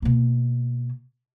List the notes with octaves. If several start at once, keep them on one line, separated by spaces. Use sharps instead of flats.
B2 A#3